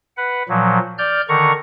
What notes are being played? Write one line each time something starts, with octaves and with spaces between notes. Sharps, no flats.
B4 F#5
A#2 F3 F#3
D5 F6 G6
D3 D#3 A#5 C#6